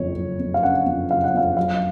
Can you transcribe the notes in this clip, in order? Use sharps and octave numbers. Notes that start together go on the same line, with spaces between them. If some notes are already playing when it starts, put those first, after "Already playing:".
Already playing: F#1 F2 C#5
F#1
F2
F5
C#3 F#5
F2
F#1 F5
F#5
F2 F5
F#3 F5